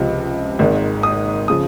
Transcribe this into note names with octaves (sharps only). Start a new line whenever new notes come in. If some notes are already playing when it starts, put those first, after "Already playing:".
Already playing: C#2 C3 F3
G#1 G#2 D#3
D#6
C#3 F3 D#6